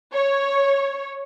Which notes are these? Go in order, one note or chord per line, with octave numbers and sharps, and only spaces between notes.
C#5